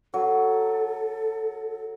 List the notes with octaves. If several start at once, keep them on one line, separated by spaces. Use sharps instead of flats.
F#3 A4